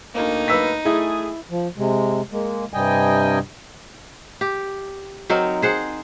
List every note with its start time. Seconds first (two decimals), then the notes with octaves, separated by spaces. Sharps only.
0.15 D2 A#3 D#4
0.48 B4 E6 B6
0.85 A3 E4 G#4
1.51 F3
1.78 C3 G#3
2.32 G#3 A#3
2.74 G2 C3 G3 D#5 G5 G#5
4.41 G4
5.30 F#3 C4 D#4 A#4
5.62 G#4 C5 F#5